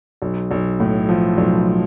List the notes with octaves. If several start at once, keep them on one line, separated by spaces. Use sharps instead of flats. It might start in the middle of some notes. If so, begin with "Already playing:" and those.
B1
B1
A2
F3
B1